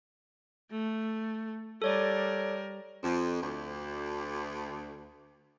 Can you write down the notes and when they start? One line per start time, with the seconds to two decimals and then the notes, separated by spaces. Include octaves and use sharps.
0.71 A3
1.82 G3 A4 A#4 C#5 D5
3.03 F2
3.41 D2